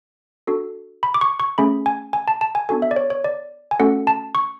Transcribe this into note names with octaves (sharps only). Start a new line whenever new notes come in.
D4 F#4 A4
B5
D6
C#6
C#6
A3 C#4 G#4 B5
G#5
G#5
A5
A5
G#5
B3 D4 F#4 A4 G#5
E5
D5
C#5
C#5
D5
G#5
A3 C#4 F#4 A4 F#5
A5
C#6